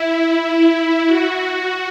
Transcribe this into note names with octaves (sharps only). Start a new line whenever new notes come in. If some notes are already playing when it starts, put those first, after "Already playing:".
Already playing: E4
F#4